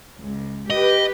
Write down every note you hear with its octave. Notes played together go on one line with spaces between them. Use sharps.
C#2
G4 B4 D#5